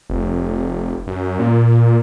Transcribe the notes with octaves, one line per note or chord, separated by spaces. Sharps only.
F1
F#2
A#2